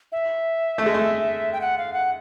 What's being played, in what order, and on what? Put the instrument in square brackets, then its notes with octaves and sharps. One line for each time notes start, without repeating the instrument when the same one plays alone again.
[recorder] E5
[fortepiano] A3
G#3
A3
[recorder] G5
F#5
F5
F#5